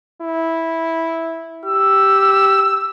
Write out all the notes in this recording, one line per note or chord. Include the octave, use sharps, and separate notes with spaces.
E4
G4 E6